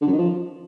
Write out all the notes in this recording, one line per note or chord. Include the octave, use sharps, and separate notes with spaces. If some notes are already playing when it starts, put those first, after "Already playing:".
D3
F#2
D#3
F3